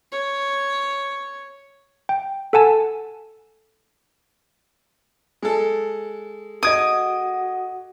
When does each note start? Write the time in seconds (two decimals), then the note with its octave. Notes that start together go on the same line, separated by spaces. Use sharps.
0.12 C#5
2.09 G5
2.53 A4 F#5 G#5 A5
5.42 G#3 A4
6.63 F#4 D#5 D#6 G#6 D7